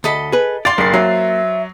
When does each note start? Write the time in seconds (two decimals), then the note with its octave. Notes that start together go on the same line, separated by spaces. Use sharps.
0.04 D2 A4 D#5 B5
0.32 G#4 B4
0.65 D5 F5 G5 C6 A6
0.78 F#1 A#3 C7
0.94 F#3 C5 E5